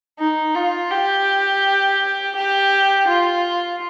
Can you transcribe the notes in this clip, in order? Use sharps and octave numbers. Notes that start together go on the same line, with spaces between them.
D#4
F4
G4
G4
F4